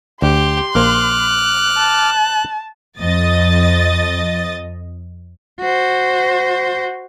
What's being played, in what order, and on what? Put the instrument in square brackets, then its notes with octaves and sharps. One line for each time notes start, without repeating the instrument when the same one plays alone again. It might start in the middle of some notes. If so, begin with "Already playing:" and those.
[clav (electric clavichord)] D2 [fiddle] G4 [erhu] C6
[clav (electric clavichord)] A#1 A#3 C5 [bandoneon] D6 F6 [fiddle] F#6
[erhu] A5
[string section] F2 D#5 D#6 A6
[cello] F#4 C5